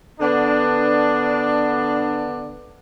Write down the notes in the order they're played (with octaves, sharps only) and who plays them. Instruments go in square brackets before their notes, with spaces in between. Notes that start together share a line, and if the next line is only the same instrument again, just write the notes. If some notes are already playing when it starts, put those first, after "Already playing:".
[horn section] D3 B3 D4